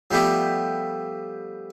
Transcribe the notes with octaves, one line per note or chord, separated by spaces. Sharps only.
F3 G3 A3 B3 G4